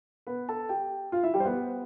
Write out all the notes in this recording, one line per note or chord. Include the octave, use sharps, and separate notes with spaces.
B3 B4
A4 A5
G4 G5
F4 F5
E4 E5
G3 G4
C5
B3 B4